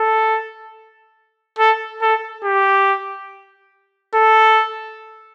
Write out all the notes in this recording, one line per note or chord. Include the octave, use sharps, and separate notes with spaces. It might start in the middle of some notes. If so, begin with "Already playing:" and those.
Already playing: A4
A4
A4
G4
A4